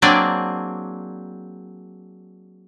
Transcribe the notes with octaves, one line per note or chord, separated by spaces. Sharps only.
F#3 A#3 C4 D4 G#4 D5